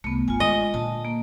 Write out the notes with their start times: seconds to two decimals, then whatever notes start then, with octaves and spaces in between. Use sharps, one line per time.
0.04 C2 A3 B3
0.28 G1 F4 G#5
0.40 G#3 D#5
0.74 A#2 D3 A5
1.05 A#3